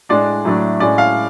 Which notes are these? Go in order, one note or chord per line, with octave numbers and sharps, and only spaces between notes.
A2 G#3 D4 D5
A2 F#3 A3 D4
A2 G#3 C#4 D5
F5